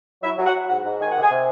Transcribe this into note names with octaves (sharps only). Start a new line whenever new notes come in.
F#3 E4 E5
F#3
F#4 F#5
F#3
G#2 F#4 F#5
G#2
D#3 G#5
C3 F#5
G#4 G#5
C3